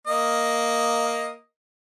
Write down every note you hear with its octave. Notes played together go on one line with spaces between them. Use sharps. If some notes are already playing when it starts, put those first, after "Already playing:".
A#3 D#5